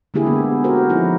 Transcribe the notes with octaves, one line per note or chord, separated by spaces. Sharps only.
D3 G#3 A#3 E4 G4 G#4
B3
F#4 A#4 C5
F3 C#4 D#4 E4